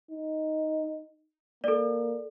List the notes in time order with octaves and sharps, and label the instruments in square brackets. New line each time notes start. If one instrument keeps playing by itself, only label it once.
[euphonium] D#4
[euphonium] A#3 [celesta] A4 D5